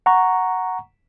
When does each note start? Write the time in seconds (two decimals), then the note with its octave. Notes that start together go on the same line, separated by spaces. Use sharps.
0.06 F#5 A#5 C#6